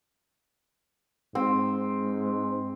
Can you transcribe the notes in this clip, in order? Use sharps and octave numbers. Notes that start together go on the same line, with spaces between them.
G#2 C4